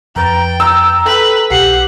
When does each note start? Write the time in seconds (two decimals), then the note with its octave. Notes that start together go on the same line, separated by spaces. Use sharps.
0.16 F2 B4 G5 A#5 A6
0.60 A#5 E6
1.06 A4 B4 G5
1.51 B1 G4 F#5 C7